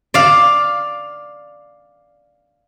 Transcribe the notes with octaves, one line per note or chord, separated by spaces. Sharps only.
D5 F5